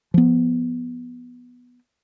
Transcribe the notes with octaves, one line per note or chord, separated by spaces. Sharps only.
F3 B3